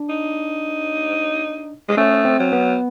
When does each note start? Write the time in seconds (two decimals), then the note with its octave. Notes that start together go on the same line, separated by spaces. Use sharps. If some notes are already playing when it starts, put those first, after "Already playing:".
Already playing: D4
0.09 D#4
1.88 G#3
1.97 A3 C#4
2.25 C4
2.39 F#3
2.53 B3